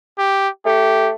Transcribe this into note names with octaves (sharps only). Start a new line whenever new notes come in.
G4
A3 G4